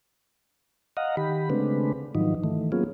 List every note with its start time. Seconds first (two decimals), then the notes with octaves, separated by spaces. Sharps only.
0.97 D#5 F5 F#5 A#5
1.17 D#3 G4 B5
1.50 C#3 G#3 A3 C4 D4 B4
2.15 G#2 D#3 F3 F#3 D#4
2.44 D#3 E3 A3
2.72 F#3 A#3 B3 C#4 F4 G#4